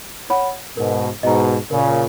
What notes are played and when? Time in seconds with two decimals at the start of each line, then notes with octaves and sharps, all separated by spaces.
0.30 C#5 F#5 B5
0.77 G#2 B2 A#4
1.23 G#2 B2 D#5 A#5
1.71 A#2 C#3 A#4